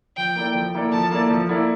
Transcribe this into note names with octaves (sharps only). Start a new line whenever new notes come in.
F3 G5
A#3 E4 A4 D5
F3
A#3 E4 A4 D5
F3 A5
A#3 E4 A4 D5
F3
A#3 E4 A4 D5